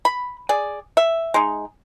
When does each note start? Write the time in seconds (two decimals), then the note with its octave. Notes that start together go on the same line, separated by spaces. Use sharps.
0.05 B5
0.49 G#4 D5
0.97 E5
1.34 G#3 D#4